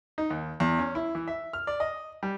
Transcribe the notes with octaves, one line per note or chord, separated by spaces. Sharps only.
D#4
D#2
E2
C#4
E4
E3
E5
F6
D5
D#5
G3